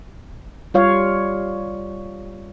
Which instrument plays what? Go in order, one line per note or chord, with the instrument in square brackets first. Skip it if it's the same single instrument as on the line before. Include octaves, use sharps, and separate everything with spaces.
[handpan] G3 F4 C#5 F5